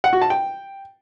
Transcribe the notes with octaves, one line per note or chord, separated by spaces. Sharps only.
F#5
F#4
A5
G5